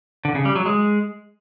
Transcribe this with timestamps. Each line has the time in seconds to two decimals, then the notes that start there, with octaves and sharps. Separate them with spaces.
0.25 D3
0.35 C#3
0.45 G3
0.56 F#3
0.66 G#3